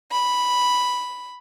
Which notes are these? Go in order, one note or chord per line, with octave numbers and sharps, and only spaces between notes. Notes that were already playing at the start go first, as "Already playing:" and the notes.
B5